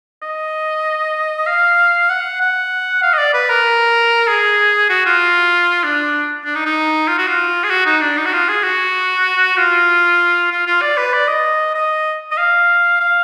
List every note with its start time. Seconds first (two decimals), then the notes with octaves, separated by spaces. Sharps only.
0.22 D#5
1.46 F5
2.09 F#5
2.41 F#5
3.02 F5
3.13 D#5
3.18 D5
3.34 B4
3.49 A#4
4.28 G#4
4.89 F#4
5.06 F4
5.83 D4
6.45 D4
6.55 D#4
6.66 D#4
7.08 F4
7.18 F#4
7.27 F4
7.64 G#4
7.70 F#4
7.86 D#4
8.01 D4
8.17 D#4
8.26 F#4
8.33 F4
8.49 G#4
8.64 F#4
9.57 F4
10.51 F4
10.67 F4
10.82 D5
10.97 B4
11.13 D5
11.28 D#5
11.75 D#5
12.31 D#5
12.37 F5
13.00 F5